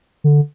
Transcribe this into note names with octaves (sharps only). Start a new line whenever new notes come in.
D3